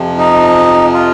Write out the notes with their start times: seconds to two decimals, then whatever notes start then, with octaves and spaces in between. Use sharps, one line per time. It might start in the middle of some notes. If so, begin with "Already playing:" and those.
Already playing: F2 C3 F3
0.18 D#4
0.94 F4